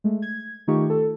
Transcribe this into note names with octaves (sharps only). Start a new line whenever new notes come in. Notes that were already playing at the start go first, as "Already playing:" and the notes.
G#3 A3
G#6
D#3 A3 D#4 F4 G4 C#6
A4